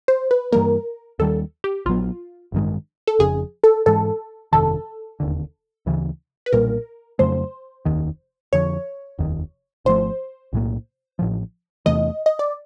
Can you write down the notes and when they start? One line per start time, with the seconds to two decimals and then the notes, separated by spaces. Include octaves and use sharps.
0.08 C5
0.31 B4
0.52 G2 E3 G3 A#3 A#4
1.19 D#2 D#3 G3 A4
1.64 G4
1.86 A#1 A2 F#3 B3 F4
2.52 A1 G2 D#3 G#3
3.07 A4
3.19 F1 F2 C#3 G#4
3.64 A4
3.86 G#2 E3 G#3 A4
4.52 G1 F2 C3 D#3 A4
5.20 E1 D#2 D3
5.86 D2 C#3 E3
6.46 B4
6.52 B1 A#2 G3 A#3 A#4
7.19 F2 C#3 F#3 A3 C5
7.85 F1 D#2 D#3
8.53 F2 D3 F3 C#5
9.19 F1 D#2 D#3
9.85 G#1 G#2 F3 A3 C5
10.53 B1 A2 F3 A#3
11.19 A1 A2 F3
11.86 E2 C3 E3 A3 D#5
12.26 D#5
12.39 D5